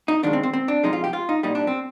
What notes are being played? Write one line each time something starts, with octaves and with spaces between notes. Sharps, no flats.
D#4
D#2 D#3 G#3 D4
C4
C4
C4
D4
F2 C3 F3 G#3 D#4
F4
G4
F4
D#4
C2 A#2 G3 D#4
D4
C4